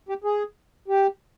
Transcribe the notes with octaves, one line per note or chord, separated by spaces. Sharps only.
G4
G#4
G4